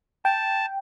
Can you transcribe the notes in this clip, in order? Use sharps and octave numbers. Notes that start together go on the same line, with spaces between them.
G5 A5